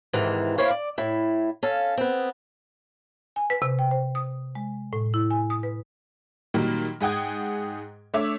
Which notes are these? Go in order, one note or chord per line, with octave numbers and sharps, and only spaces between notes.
G#2 C3 D#3 E3
A#3 E4 C5 C#5 F5
D5
A2 E4
C#4 A4 F5
B3 C4
G#5
B4
C3
G5
C5
D#6
G#3
A2
E4
G#5
D#6
B4
A#2 D#3 F#3 G3 A#3
G#2 G#4 F#5 G5 D#6 G#6
A3 D4 C#5 E5 D6 E6